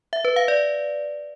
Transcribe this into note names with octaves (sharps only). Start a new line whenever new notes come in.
E5
B4
F5
D5